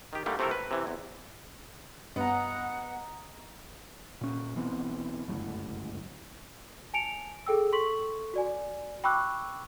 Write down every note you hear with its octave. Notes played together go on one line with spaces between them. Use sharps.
D#3 G4
D3 G3 A3 A#3
C3 A3 C4 E4 A4 A#4
B4
C3 E3
E2
G2 B3 D#5 F#5 A#5
A#2 C#4
B1 E3 B3 C4
G1 C#2 F#2 A2
G#5 A5 C#7 D7 F7
G#4 A4 G5 E6
A4 C6 C#6 B6 F#7
F#4 D5 G#5
G5 B5 C#6 D6 E6 F#6